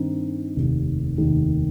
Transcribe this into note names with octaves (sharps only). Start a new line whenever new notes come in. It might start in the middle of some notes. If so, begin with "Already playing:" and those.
Already playing: G2 D#3 C4 D#4
F1 D#2 D#3
F1 D#2 D#3